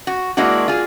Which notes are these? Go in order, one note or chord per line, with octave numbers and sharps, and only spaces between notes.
F#4
G#3 A#3 D4 E4 F#4
F4 G#4